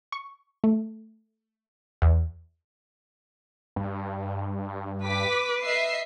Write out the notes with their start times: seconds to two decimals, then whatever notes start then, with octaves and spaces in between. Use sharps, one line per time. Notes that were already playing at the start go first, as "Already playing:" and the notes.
0.12 C#6
0.64 A3
2.02 E2
3.76 G2
5.05 B4 D6 B6
5.62 D#5 E5 C7